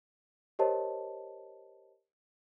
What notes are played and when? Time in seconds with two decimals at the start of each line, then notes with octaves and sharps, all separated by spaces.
0.59 G4 A#4 C5 C#5 D#5 A5